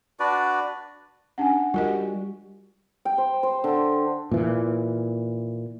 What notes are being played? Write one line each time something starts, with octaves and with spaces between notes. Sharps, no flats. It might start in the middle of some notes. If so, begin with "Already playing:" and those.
D4 F#4 B4 D5
C#4 D4 F#5 G#5
G3 F4 F#4 A#4 D#5
G5
C5
C5
D3
A#2 E3